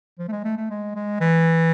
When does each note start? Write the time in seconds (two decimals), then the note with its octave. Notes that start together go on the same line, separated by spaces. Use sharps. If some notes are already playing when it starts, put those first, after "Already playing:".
0.19 F3
0.28 A3
0.32 G#3
0.44 A3
0.57 A3
0.70 G#3
0.95 G#3
1.20 E3